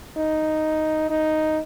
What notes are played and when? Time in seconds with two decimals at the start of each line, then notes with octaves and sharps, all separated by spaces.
0.17 D#4
1.10 D#4